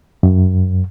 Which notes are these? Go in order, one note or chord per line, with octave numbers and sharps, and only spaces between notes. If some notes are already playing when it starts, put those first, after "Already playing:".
F#2